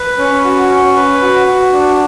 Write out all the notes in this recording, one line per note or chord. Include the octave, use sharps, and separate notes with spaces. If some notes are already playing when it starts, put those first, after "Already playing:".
Already playing: B4
C#4
F#4
C#4
B4
F#4
F#4
D4